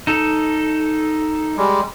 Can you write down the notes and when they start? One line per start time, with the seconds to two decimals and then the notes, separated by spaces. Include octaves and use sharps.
0.07 D#4 A4
1.57 G3 G#3